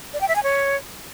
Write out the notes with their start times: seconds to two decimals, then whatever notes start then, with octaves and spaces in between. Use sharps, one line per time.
0.13 D5
0.21 G5
0.28 E5
0.36 G#5
0.43 C#5